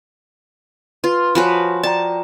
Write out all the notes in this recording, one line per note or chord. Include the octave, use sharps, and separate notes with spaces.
F4 B4
F3 F#4 B4 C#5 G#5 B5
D5 G5 A5 A#5